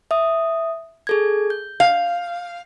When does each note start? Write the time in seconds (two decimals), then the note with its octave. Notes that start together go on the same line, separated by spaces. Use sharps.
0.11 E5 D#6
1.07 G#4 A4 G#6
1.50 G6
1.80 F5